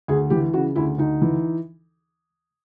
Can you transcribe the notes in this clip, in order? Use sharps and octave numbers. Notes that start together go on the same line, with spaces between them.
D2 G#4
E3 G4
C#3 F#4
D2 E4
D2 D#4
E3